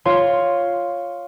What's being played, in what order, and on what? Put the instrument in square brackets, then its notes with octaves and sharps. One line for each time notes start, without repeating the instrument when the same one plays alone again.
[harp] F4 C#5 C6